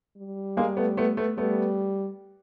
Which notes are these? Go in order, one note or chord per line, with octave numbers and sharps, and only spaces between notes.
G3
G#3 A#3
A3 B3
A3 B3
A3 B3
G3 A3 B3